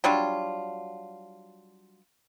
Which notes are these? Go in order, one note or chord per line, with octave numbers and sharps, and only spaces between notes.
F#3 G3 D4 F4